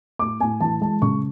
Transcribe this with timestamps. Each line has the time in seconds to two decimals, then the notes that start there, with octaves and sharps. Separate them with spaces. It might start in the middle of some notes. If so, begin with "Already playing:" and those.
0.19 A2 D6
0.41 A2 G#5
0.61 E3 A5
0.81 G#3 A5
1.02 C#3 C#6